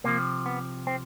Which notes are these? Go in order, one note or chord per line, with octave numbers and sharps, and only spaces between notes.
C3 F3 A#3
B3
C4